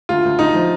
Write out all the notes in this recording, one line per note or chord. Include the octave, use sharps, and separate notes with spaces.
D2 F4
D2
D2 D#4
F3